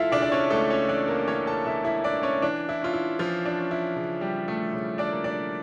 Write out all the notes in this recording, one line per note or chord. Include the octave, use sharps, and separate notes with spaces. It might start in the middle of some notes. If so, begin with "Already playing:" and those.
Already playing: C#2 E3 E4 F4 A4 E5 F5 A5
C#3 D4 D5
D5
C#4 C#5
C#2 A3 A4
C#4 C#5
E3 D4 D5
A#3 A#4
E3 C#4 C#5
A4 A5
C#3 E4 E5
E4 E5
E3 D4 D5
C#4 C#5
E3 D4
E4
C#4 F4
E4
E3 F3 F4
D4
C#4
E4
C#3
G3 G4
C#4
A3 A4
C#3
D4 D5
A#3
D4 D5